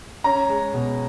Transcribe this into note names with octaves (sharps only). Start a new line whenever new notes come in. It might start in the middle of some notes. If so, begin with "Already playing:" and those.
C#4 A#5
G#3
B2